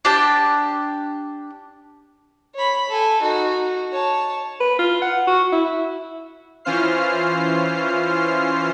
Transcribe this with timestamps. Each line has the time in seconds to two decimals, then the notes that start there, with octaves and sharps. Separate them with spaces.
0.05 D4 G4 A5
2.55 C#5 B5
2.89 A4 G#5
3.22 D#4 F#4
3.92 C#5 A5
4.60 B4
4.79 F4
5.02 F#5
5.27 F#4
5.52 E4
6.65 E3 C#4 F4 C5 F6 C7